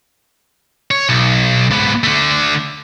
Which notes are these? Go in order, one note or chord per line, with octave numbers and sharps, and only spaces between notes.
C#5
B1
G#2 B3
D3 A3